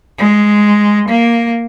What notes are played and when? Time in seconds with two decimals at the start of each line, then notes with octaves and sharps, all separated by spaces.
0.18 G#3
1.09 A#3